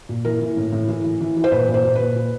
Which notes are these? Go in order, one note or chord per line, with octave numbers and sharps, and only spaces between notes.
A#2
E3 A#4
E3
A2
A2
E3
E3
E3
E3
C5
A#2 B4
A#2
C5
A#2
A#2 B4
A#2